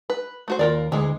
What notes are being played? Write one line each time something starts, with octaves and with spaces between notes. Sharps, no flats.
B4
A3 F#4 C5
D#2 F4 A#4 D5
D2 E3 G#3